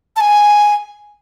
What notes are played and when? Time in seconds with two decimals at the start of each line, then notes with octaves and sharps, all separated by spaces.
0.16 A5
0.21 G#5